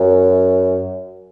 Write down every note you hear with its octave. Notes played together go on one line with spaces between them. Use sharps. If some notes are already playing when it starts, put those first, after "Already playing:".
Already playing: F#2